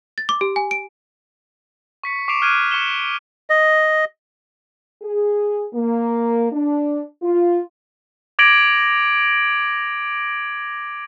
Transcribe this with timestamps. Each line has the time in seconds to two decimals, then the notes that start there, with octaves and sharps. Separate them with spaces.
0.18 A6
0.29 D6
0.41 G4
0.56 G#5
0.71 D7
2.04 C#6 B6 C#7
2.28 C#6 D6 C7 D7 E7 F7
2.41 D6 F6 F#6 G#6 D7 D#7
2.71 C#6 C#7 E7 G7
3.50 D#5
5.02 G#4
5.74 A#3
6.52 D4
7.23 F4
8.39 D6 G#6 A#6 D7 F#7